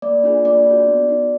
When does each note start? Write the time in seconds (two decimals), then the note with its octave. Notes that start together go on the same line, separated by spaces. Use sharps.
0.02 A#3 D5
0.24 D4 F4 G#4
0.45 A#3 D5
0.66 D4 F#4
0.87 B3
1.09 D#4 F#4